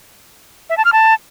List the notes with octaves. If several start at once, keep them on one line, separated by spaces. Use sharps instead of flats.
E5
A5
F6
A5